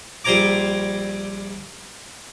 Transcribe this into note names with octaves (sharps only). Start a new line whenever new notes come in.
A#1 G3 C5 G#5 A#5 D6